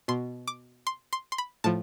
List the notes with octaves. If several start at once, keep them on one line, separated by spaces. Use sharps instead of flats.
B2 C6
D6
C6
C6
C6
B5
A2 F3 A5